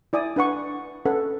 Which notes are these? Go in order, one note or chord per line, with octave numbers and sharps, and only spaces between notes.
E4 D5 G#5 D#6
D4 B4 F#5 C#6
C#4 A4 B4 F#5